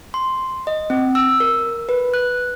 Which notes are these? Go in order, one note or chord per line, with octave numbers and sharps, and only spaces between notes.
C6
D#5
C4
E6
A#4
B4
F#6